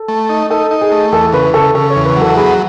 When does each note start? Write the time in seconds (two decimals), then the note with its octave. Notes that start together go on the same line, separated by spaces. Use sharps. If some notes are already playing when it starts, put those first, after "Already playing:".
Already playing: A4
0.08 A3
0.29 D#4
0.50 D#4 A4
0.71 D#4
0.81 G#4
0.91 A3
1.12 E2 A4
1.33 C#3 B4
1.54 C#3 A4
1.75 C#3 A4
1.90 C#5
1.96 E2
2.05 B4
2.16 F#3
2.21 A4
2.36 B3 G#4